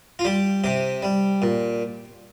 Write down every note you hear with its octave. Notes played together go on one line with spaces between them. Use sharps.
F4
G3 G4
C3 G4
G3
A#2